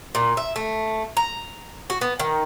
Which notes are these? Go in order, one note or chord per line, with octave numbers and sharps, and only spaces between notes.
A#2
E5
A3
A#5
F#4
B3
D#3